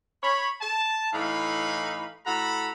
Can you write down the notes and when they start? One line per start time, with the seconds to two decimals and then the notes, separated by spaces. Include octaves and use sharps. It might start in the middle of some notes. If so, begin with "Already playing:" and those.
0.22 C#5 B5
0.60 A5
1.12 A2 E3 D#4 F5 B5
2.25 A2 F#4 A4 A#5 B5